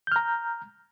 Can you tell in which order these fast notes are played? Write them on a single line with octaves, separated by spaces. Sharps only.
G6 F6 A#5